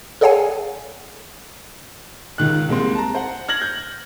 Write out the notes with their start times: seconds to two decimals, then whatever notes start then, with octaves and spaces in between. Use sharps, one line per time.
0.21 G#4 A4 C#5 F5 F#5 G#5
2.38 C#2 D#3 F#6
2.68 C2 G#3 A#3 C4 C6
2.95 A5 A#5
3.15 C5 F#5
3.48 F6 G#6 A#6 F#7
3.61 G6